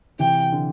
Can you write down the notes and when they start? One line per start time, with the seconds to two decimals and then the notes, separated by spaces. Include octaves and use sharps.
0.19 C3 E3 G5
0.52 D3